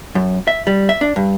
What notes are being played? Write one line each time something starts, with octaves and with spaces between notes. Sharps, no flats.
F#2
E5
G3
E5
D4
G2